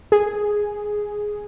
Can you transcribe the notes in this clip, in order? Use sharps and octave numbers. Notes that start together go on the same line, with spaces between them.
G#4